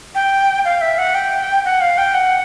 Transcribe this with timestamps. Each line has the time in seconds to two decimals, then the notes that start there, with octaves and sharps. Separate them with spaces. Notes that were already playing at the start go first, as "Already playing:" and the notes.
0.15 G5
0.65 F5
0.81 E5
0.98 F#5
1.15 G5
1.65 F#5
1.81 F5
1.98 G5
2.14 F#5